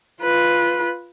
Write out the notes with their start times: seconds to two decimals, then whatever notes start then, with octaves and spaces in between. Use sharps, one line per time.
0.22 F4 B4